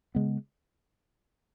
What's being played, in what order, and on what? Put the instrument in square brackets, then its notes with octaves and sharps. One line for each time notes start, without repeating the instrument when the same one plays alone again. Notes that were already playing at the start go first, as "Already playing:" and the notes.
[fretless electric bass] C#3 G#3 B3